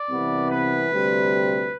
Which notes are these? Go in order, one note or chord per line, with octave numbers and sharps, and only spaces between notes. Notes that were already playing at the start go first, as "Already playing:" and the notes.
Already playing: D5
C2 C3 E3 B3
B4
D2 C3 G3 C4